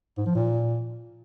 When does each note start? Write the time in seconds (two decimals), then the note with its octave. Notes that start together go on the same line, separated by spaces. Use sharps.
0.18 G#2
0.26 F3
0.35 A#2